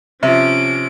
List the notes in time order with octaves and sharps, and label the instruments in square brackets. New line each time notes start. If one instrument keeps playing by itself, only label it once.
[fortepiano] C3 F3 [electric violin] C#4 D7 [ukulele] E5